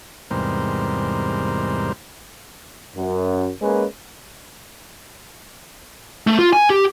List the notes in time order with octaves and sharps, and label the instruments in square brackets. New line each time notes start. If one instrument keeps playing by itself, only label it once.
[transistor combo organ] E2 G#2 C3 G3 A#4 C5
[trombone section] F#2
G#3 A#3 C#4 B4
[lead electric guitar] A3
F4
G#5
G4